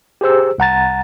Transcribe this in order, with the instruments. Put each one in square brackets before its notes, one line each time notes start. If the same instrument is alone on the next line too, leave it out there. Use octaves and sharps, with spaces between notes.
[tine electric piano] G4 G#4 C5 E6
C2 F#5 A#5 A6